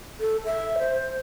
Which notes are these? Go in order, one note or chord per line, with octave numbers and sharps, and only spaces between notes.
A4
E5
C5